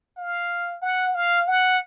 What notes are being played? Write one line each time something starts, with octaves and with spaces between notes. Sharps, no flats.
F5
F#5
F5
F#5